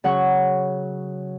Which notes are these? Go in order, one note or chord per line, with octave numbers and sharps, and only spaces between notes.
C#3 F#3 C#5 F#5 C#6